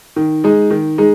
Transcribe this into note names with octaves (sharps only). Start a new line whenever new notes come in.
D#3
G#3 D#4 G#4
D#3
G#3 D#4 G#4